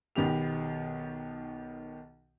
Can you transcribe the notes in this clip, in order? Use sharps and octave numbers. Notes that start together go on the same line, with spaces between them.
B1 D#3 B3 G4 F7